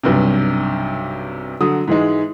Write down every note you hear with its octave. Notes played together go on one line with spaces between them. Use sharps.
B1 G2 C3
D3 F#3 D#6
G#2 E3 G#3